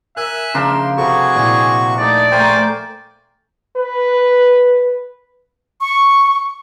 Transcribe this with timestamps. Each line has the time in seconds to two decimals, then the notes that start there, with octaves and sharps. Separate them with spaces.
0.17 A#4 E5 G#5 E6 F#6
0.54 C#3 F3 D4 A#4 C6 E7
0.98 C3 F#4 G#4 A4 B5 C#6
1.36 A#2 E4 G#5
2.00 A3 D#4 D5
2.32 A3 A#4 C5 G5 G#5
3.76 B4
5.81 C#6